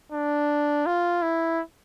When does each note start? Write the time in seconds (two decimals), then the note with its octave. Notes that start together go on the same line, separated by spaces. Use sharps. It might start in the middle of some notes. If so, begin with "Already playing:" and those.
0.12 D4
0.86 F4
1.22 E4